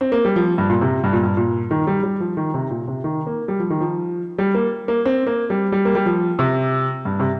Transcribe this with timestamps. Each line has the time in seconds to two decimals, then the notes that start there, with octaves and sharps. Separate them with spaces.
0.01 C4
0.12 A#3
0.25 G3
0.36 F3
0.58 G2
0.70 A#2
0.81 C3
1.04 G2
1.13 A#2
1.23 G2
1.37 A#2
1.71 D#3
1.87 G3
2.03 G3
2.20 F3
2.37 D#3
2.54 C3
2.71 A#2
2.88 C3
3.04 D#3
3.27 A#3
3.48 G3
3.60 F3
3.70 D#3
3.81 F3
4.38 G3
4.55 A#3
4.88 A#3
5.05 C4
5.27 A#3
5.50 G3
5.72 G3
5.85 A#3
5.95 G3
6.06 F3
6.39 C3
7.05 G2
7.20 C3